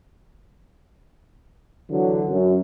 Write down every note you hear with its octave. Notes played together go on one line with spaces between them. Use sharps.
D3 E3 F#3
F#2